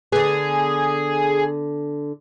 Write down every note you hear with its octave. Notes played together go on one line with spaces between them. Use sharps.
D3 B3 G#4